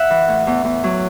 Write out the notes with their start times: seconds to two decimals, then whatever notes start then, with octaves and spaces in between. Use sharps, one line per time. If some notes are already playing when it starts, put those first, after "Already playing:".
Already playing: E5 F#5
0.10 E3
0.28 A2
0.47 E2
0.65 E2
0.84 F#3